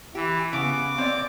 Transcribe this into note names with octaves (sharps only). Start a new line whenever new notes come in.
E3 G4
C#3 B3 D6
C4 C#5 D5